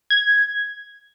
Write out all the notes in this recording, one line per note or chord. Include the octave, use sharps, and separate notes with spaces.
G#6